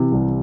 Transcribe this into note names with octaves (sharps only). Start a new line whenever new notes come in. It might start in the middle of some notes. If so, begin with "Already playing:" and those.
Already playing: C3 E3
C2